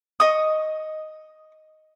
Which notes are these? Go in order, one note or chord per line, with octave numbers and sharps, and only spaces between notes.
D#5 C#6 D#6